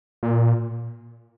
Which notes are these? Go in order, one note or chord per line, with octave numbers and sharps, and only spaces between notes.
A#2